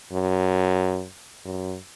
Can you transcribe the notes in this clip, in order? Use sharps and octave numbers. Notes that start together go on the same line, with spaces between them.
F#2
F#2